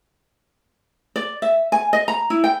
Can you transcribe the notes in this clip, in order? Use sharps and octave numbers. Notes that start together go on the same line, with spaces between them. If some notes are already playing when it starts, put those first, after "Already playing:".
D5
E5
G#5
D#5
A#5
E4
G5